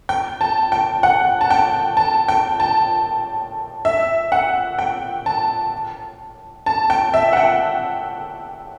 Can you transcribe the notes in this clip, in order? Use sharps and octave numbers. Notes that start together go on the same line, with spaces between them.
G5
A5
G5
F#5
A5
G5
A5
G5
A5
E5
F#5
G5
A5
A5
G5
E5
F#5
G5